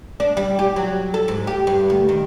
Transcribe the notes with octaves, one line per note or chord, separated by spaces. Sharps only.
D4
G3
G4
F#3
A4
G#2
G4
G2
D2
D#3